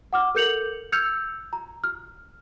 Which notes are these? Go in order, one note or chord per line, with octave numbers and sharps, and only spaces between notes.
F#5 D6 F6
A4 A#4 G6 C#7 F7 F#7
E6 F6 G6 G#6 C#7 F7
A#5
F6